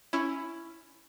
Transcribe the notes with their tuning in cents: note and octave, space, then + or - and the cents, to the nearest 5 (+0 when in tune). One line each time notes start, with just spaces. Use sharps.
C#4 +0 E4 +10